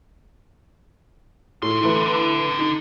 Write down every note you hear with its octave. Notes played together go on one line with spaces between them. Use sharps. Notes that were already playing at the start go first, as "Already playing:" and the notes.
A2 D3 C6
E3 A3 B4
D#4